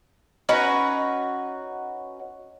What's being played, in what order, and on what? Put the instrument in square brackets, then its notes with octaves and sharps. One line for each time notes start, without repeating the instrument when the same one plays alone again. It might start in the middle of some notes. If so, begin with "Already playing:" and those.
[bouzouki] C#4 D#4 F#4 B4